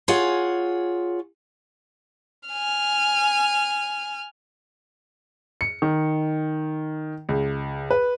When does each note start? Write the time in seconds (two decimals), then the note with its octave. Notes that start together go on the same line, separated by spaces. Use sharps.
0.08 F4 G#4 C#5 F#5
2.49 G#5 F6
5.61 C#7
5.82 D#3
7.29 C#2
7.90 B4